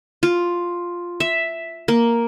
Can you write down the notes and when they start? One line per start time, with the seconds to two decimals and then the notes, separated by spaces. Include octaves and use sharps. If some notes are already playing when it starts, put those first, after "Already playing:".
0.23 F4
1.20 E5
1.88 A#3